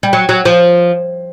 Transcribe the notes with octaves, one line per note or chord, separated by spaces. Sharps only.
G3
F#3
F#3
F3